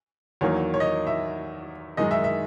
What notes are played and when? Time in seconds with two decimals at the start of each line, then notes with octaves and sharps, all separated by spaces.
0.41 E2 D#3 F#3 A#3 C#5
0.74 C#5
0.80 D#5
1.07 E5
1.97 F#2 D#3 G#3 D#4 D#5
2.11 E5
2.24 E5